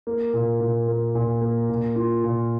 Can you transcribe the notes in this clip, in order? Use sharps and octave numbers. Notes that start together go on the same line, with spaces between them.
A#3
A#2
A#2
A#3
A#2
A#3
A#2
F4
A#2